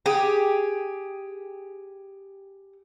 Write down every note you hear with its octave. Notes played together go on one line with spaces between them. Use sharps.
G4 G#4